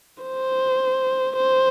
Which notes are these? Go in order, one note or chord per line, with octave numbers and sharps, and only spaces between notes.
C5
C5